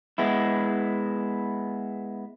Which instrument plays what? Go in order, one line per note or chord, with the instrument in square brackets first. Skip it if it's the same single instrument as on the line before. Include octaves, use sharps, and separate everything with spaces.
[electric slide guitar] G#3 B3 E4